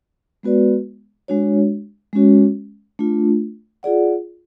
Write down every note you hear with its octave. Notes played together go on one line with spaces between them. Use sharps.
G#3 B3 F#4 B4 D5
G#3 D4 F#4 C#5
G#3 C#4 F#4 C#5
A3 D4 F4
F4 G#4 D5 F#5